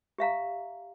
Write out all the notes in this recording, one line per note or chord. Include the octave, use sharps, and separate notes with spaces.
G4 E5 F5 A#5